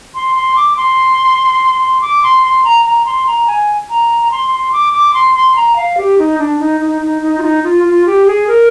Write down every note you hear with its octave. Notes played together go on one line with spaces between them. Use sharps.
C6
C6
D6
C6
C6
D6
C6
C6
A#5
A#5
C6
A#5
G#5
A#5
C6
C6
D6
D6
C6
C6
A#5
F5
G4
D#4
D4
D#4
D#4
D#4
D#4
F4
D#4
F4
F4
G4
G#4
A#4